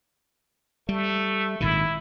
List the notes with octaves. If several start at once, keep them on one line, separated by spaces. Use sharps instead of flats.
G3 A3
G#1 A#2 D#3 E4